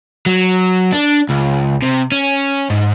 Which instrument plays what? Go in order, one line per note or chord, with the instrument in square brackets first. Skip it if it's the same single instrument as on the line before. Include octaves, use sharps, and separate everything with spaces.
[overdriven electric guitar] F#3
D4
C#2
C3
C#4
G#2